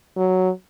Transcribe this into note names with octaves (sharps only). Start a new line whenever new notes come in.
F#3